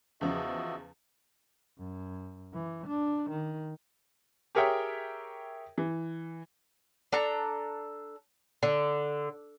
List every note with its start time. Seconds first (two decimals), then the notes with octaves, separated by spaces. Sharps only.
0.21 E2 C#3 F3 F#4 D#5 E5
1.79 F#2
2.53 E3
2.87 D4
3.30 D#3
4.55 G4 G#4 A#4 C#5 E5 G5
5.78 E3
7.12 D4 A4 A#5
8.63 D3